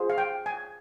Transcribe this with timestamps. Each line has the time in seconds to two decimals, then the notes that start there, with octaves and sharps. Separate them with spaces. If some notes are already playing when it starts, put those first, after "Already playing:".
Already playing: F4 G#4 C5
0.10 F5
0.18 G5
0.46 G#5